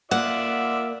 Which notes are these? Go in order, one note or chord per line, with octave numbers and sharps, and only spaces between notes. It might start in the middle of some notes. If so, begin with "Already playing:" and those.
A#3 F4 D5 E5 F#5